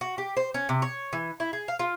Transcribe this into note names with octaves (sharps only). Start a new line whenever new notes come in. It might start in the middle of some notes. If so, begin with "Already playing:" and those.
F#4
G4
C5
C#4
C3
C#5
E3
E4
G#4
F5
F4